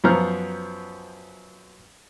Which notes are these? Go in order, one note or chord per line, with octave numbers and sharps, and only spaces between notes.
F#2 F3 B3 C5 A#5 F6